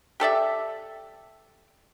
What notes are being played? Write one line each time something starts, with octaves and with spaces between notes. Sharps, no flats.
G4 A4 D5 E5